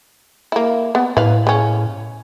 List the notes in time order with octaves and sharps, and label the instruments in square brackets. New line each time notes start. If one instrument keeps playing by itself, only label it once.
[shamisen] A#3 E4
B3
[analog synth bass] A2 [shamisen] B4 F5
[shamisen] C#3 C#4